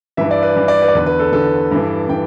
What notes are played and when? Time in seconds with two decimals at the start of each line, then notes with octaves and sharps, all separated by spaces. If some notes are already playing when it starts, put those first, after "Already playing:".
0.17 G2 E3 E5
0.31 D5
0.43 B4
0.56 G2 E3
0.68 D5
0.82 B4
0.88 D5
0.95 E2 D3 B4
1.06 B4
1.20 A4
1.32 E2 D3 A4
1.71 G2 E3
2.09 E3 G5